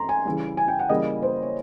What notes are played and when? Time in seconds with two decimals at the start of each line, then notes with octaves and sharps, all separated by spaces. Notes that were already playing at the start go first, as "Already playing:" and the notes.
Already playing: E3 A3 C4 E4 A#5 C6
0.09 G#5
0.25 C#3 E3 G3
0.57 G#5
0.68 G5
0.79 F#5
0.89 C#3 E3 G3 A#3 D#5
1.22 C5
1.42 C#5